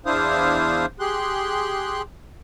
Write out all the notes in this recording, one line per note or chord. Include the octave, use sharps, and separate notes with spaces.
E2 D4 E4 C5 F5 D#6
G4 G#4 C6 F#6